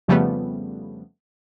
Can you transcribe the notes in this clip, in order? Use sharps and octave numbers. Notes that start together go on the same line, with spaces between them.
F2 C#3 F3 G3 A3 B3